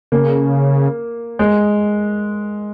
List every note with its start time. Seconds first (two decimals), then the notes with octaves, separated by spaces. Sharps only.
0.12 C#3 A#3
1.39 G#3